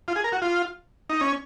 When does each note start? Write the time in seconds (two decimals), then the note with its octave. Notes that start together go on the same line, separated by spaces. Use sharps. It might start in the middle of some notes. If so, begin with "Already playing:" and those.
0.08 F4
0.16 G#4
0.24 A#4
0.32 F#4
0.42 F4
1.09 D#4
1.21 C#4